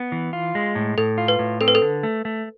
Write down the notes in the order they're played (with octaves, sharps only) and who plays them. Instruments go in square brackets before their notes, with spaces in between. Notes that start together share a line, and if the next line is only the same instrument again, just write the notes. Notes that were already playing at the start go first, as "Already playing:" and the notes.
Already playing: [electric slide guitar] B3
E3
F4
G#3
A2
[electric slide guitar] A2 [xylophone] A4
[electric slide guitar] F4
[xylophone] B4
[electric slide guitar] A2
[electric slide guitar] C4 [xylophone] A4
[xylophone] B4
A4
[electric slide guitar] D3
A3
A3